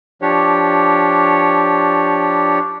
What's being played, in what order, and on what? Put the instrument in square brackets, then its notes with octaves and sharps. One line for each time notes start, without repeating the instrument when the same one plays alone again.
[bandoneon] F3 D4 G4 C#5